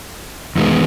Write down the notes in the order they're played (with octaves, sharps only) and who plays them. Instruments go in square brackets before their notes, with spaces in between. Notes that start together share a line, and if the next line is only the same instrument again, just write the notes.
[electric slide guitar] E2 D#3 G#3 B3